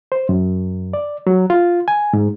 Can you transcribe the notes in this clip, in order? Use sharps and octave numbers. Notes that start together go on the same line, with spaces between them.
C5
F#2
D5
F#3
F4
G#5
G#2